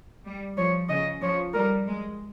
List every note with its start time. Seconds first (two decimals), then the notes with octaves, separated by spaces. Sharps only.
0.26 G3
0.57 F3 C#5
0.89 C#3 D#5
1.22 F3 C#5
1.54 G3 A#4
1.87 G#3